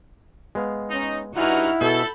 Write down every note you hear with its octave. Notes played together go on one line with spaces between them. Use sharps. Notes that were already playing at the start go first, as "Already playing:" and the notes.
G#3 B3 F5
C#4 D#4
G2 D#4 E4 F#4 F#5 G#5 F6
B2 G#4 A4 B5 G6